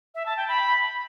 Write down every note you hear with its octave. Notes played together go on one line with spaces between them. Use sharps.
E5
A5
G5
B5